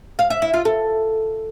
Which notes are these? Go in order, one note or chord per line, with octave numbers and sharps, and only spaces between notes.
F5
E5
E4
F4
A4